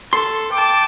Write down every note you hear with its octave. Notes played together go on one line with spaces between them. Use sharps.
A4 C6
G5 A5 D6